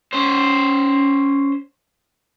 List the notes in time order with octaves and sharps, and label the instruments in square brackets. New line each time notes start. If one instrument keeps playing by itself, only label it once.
[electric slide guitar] C#4 C5